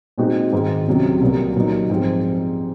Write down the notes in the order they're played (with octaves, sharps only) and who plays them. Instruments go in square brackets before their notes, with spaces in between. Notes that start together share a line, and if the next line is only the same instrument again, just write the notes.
[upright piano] A#2 G#3 C4 D#4 F#4
G#2 D#3 G#3
C#2 C3 F#3
C2 A#2 F#3 A#3
A#2 F#3 A#3 D#4
G#2 F3 G#3 C4